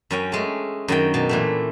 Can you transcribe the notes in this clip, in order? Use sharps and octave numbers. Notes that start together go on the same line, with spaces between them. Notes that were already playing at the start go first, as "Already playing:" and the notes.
F#2 C#4 G5
G#3 A3
F#2 D#3 G5
B2 D5
A#2 E3 A3